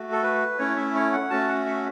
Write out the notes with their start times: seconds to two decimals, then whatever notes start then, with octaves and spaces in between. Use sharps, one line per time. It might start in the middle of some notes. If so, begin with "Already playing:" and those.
Already playing: A3 F#4
0.12 A4
0.23 B4
0.58 A3 C#4 E4 C#5
0.76 E5
0.95 C#5
1.12 F#5
1.30 A3 C#4 F#4 A5
1.48 F#5
1.66 E5